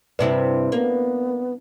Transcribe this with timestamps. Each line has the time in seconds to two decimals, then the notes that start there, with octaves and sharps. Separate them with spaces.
0.19 G2 C3 E4 B4 D5
0.72 A#3 B3